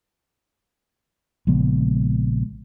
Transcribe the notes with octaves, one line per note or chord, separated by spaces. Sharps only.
A#1 C#3 G#3 B3